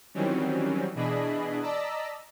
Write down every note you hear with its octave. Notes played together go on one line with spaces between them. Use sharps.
D#3 E3 F#3 G3 C4 C#4
B2 E3 D4 G#4 D#5 B5
D5 D#5 A5 A#5 E6 B6